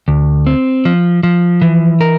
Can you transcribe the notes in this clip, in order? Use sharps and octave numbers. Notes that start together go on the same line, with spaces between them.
D2
C4
F3
F3
E3
A#4